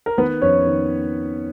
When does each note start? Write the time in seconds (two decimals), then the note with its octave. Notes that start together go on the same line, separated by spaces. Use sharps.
0.06 A#4
0.17 D#3 B3 B4
0.42 F2 C#4 C#5
0.66 D#3